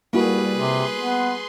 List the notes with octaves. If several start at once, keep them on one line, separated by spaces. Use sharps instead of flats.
G3 A#3 E4 F#4 G#4 B4
C3 C6
B3